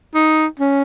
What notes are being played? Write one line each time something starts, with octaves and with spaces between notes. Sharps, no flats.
D#4
C#4